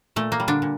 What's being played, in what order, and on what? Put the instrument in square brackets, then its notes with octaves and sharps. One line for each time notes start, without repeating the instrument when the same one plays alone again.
[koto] A#2 A3
A#3
G3
D3 D4
A#2